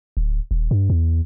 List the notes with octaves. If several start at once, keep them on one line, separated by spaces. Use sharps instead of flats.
D1
D#1
G2
E2